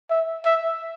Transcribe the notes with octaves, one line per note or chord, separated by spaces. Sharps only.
E5
E5